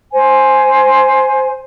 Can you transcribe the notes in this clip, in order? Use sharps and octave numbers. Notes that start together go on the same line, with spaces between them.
C5 G#5